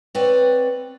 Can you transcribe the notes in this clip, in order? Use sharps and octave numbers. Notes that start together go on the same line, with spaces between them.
C4 B4 C#5 D5 F#5